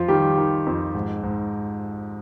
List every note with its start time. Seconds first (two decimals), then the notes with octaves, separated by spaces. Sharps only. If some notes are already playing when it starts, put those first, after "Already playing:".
Already playing: F2 F3 F4
0.08 D#3 G3 G4
0.37 D#3
0.66 F2
0.95 G#2
1.23 G#2